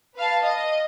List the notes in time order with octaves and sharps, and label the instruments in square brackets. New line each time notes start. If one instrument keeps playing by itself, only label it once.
[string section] B4 F5 A5
D#5